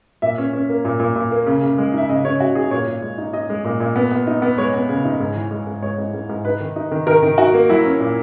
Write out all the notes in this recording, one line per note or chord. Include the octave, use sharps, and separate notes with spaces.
A#2 E5
C#4
C#4
A#3
A#2
A#2
A#2
A#3
C#3
C#3
G#3
D#4 E5
C#3 D#5
C#3 C#5
C#3 F#4
D#4 G#4
A#2 C#5
A#2
G#3
D#4
D#4 D#5
G#3
A#2
A#2
B3
B3
D#4
B3
G#3 C#5
B3
C#3
D#4
G#2
E3
G#3
G#2
G#3 C#5
G#2
G#2
G#2
D#4 B4
D#3
D#4
D#3
D#3 A#4
D#3
D#4 F#4
A#3
F#3 E4
C#4
A#2